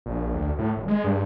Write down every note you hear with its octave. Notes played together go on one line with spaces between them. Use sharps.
A#1
D2
A2
D#1
G#3
G2